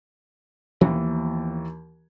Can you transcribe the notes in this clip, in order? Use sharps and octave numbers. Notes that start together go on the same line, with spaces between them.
D#2 E3 F3 A#3 B3